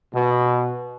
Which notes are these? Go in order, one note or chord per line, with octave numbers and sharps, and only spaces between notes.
B2